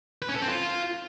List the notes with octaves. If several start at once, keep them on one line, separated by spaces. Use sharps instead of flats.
B4
C#4
A4
C4
F4